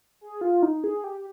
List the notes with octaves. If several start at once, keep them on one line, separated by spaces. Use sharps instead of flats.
G#4
F4
D#4
G#4
G4